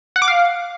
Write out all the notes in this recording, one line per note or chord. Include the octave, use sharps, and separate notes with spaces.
F#5
D6
F5